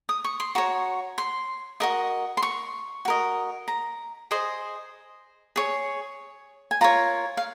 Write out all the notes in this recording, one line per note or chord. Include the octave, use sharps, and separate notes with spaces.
D#6
C#6
C6
F#4 C#5 A#5
C6
F#4 A#4 D#5 D#6
C6
C#6
F#4 A#4 D#5
A#5
G#4 C5 D#5
G#4 C#5
G#5
F4 A#4 C#5 A#5
F5